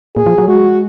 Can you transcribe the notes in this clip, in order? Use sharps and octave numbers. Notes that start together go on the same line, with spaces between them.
A#2 G#4
F3
F#3
G#3 F#4